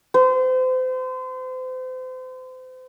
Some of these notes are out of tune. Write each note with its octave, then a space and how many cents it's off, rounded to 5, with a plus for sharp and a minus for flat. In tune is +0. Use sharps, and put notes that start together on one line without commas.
C5 -35